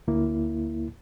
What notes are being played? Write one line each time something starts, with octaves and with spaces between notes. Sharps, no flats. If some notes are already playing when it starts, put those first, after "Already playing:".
D2 A#3 E4